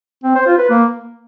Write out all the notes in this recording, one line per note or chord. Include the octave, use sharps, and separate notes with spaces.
C4
C5
F4
B4
A#3